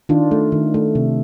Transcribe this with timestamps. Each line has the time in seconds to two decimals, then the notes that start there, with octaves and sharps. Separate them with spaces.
0.09 D#3 D4 F4
0.31 A3
0.52 D#3
0.74 A3
0.95 C3